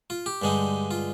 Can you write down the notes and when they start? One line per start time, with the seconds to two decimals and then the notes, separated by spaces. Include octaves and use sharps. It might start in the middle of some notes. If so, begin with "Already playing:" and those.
0.10 F4
0.26 G4
0.42 G2 D3 G#3 D#4
0.91 F4